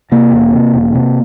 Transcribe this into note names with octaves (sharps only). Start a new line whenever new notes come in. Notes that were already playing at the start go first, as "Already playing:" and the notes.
C3 A#3
E1
C3
E1
C3